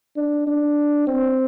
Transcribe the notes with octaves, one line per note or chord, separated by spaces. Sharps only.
D4
D4
C4